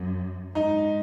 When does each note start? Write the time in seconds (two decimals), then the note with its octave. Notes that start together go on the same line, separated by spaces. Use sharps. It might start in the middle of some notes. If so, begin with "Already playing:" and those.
Already playing: F#2
0.54 G#2 D#4